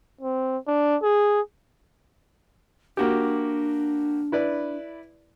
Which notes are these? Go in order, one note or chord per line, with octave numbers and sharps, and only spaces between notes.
C4
D4
G#4
A#3 D4 F#4 G4
E4 B4 D5